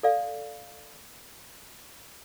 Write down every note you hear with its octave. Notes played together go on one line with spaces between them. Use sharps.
A4 D5 F5